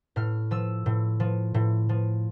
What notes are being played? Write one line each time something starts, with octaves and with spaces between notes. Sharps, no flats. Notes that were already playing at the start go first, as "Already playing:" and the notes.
A2 F6
F3 E6
A2
F3
A2
F3